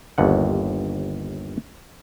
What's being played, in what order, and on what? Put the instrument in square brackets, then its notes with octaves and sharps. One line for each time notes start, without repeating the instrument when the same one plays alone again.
[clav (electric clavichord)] G1 D#2 F#5